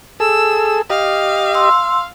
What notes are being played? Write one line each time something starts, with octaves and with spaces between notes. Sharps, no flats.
G#4 A4 E6
G4 D#5 F5
C6 E6